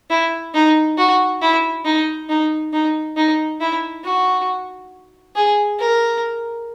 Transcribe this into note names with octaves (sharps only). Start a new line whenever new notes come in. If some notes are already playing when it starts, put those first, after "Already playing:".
E4
D#4
F#4
E4
D#4
D#4
D#4
D#4
E4
F#4
G#4
A#4